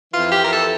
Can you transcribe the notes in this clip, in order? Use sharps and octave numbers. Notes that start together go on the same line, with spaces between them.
F2 E3 F4
G4
A#4
A4